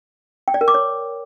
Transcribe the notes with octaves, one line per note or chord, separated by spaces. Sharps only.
G5
D5
A#4
D6
C#5